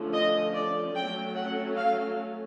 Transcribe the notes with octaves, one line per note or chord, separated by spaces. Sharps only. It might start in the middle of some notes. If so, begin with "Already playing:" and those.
Already playing: D3 F3 A3 C#4
D#5
D5
F#3 A3 C#4 G5
F#5
F5